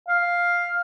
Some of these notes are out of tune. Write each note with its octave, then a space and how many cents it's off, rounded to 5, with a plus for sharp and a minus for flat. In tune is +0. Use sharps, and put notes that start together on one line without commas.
F5 +5